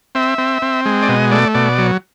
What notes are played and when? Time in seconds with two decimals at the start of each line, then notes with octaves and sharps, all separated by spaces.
0.15 C4 E5
0.38 C4
0.62 C4
0.86 G#3
1.03 D5
1.08 B2 D#5
1.31 A3 D5
1.55 B2 D5
1.78 F#3